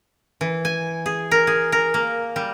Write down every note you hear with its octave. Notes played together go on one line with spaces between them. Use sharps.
E3
G#5
G#4
A#4
G#4
A#4
A#3
G3